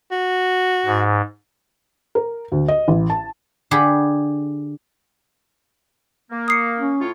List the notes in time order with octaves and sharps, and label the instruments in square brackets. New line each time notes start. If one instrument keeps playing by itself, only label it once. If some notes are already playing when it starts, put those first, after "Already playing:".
[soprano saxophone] F#4
[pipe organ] G#2
[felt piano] A#4
D2
D#5
A1
A5
[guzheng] D3 G4 G#4 F#5 B5
[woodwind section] A#3
[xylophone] D#6 C7 C#7
[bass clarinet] C#4
[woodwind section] A2 F4 C#5